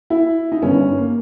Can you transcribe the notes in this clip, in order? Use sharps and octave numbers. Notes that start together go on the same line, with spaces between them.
E4
D#4
G1 G2 D#3 C#4
A#3